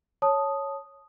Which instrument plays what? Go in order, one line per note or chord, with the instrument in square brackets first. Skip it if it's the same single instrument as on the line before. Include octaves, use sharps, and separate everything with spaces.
[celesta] C#5 A5 D#6